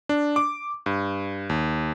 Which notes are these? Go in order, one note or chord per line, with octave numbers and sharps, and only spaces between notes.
D4
D6
G2
D#2